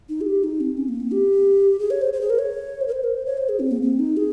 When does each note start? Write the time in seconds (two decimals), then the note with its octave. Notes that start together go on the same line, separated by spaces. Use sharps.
0.09 D#4
0.21 G#4
0.26 G4
0.44 D#4
0.60 C4
0.77 C#4
0.88 A#3
1.00 C4
1.12 G4
1.79 G#4
1.90 C#5
2.01 C5
2.13 C5
2.21 G#4
2.30 A#4
2.39 C#5
2.81 C5
2.88 A#4
2.92 C5
3.04 A#4
3.14 C5
3.26 C#5
3.38 C5
3.49 G#4
3.59 C4
3.71 A#3
3.82 C4
3.99 D#4
4.17 G#4